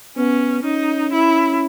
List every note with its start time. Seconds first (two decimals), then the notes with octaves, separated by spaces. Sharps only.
0.17 B3 C#4
0.64 C#4 D#4
1.12 E4